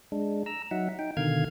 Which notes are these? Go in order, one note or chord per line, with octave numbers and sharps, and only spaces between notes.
G#3 D4
A#5 E6
F#3 D#4 E5 F#5
D#4 G5
B2 D3 D#3 F5 F6 G#6